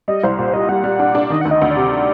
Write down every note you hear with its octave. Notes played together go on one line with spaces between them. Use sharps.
G3 D#5
C2 C5
A#2 C5
G3 D#5
G3 F#5
G3
D4
D4
D#3 D#5
D2 F#5
D#5
D2
D5
C3